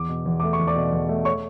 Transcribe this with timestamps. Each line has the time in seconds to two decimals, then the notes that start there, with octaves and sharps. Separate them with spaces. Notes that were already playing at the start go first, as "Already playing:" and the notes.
Already playing: E2 D6
0.09 B2
0.26 E2
0.40 A3 D6
0.53 C#6
0.59 E2
0.67 D5 D6
0.76 B2
0.93 E2
1.09 A3
1.25 C#5 C#6